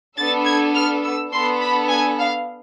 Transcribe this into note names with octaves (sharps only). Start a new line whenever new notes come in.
B3 D4 A4 A6
G#6
F6
E6
B3 D4 A4 C6
B5
G#5
F5